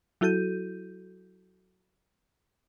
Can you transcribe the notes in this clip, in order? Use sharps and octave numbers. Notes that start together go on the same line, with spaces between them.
F#3 E4 F#4 A4 G6 D#7